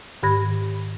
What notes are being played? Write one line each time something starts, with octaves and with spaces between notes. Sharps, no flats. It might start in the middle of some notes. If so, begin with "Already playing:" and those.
G#2 D#3 G4 B5 G#6 A#6